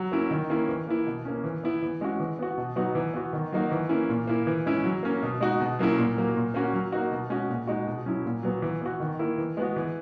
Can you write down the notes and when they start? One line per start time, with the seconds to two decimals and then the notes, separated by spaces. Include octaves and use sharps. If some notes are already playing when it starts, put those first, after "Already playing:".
Already playing: F#3
0.12 A#3 C#4 E4
0.30 D#3
0.50 A#3 C#4 E4
0.69 E3
0.87 A#3 E4
1.06 B2
1.25 A#3 C#4
1.44 E3
1.64 B3 E4
1.82 E3
2.01 G#3 C#4 F#4
2.20 E3
2.39 B3 F#4
2.58 B2
2.76 F#3 B3 D#4 F#4
2.95 E3
3.14 B3 F#4
3.33 D#3
3.52 F#3 A#3 D#4 F#4
3.72 E3
3.89 A#3 C#4 E4
4.09 A#2
4.27 A#3 E4
4.47 E3
4.66 G#3 C#4 E4
4.84 F#3
5.03 A#3 C#4
5.23 B2
5.41 G#3 D#4 F#4
5.60 B2
5.79 F#3 A#3 C#4 E4
5.98 A#2
6.17 F#3 A#3
6.36 A#2
6.54 A#3 C#4 F#4
6.73 F#3
6.92 A#3 D#4 F#4
7.11 B2
7.30 G#3 C#4 F#4
7.50 A#2
7.67 G#3 D#4 F#4
7.87 B2
8.06 F#3 C#4 E4
8.25 A#2
8.43 F#3 B3
8.62 E3
8.81 B3 F#4
9.00 D#3
9.19 A#3 E4
9.38 E3
9.57 G#3 B3 F#4
9.76 E3